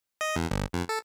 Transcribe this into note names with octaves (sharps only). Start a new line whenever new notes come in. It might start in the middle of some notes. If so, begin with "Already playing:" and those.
D#5
E2
G1
F2
A4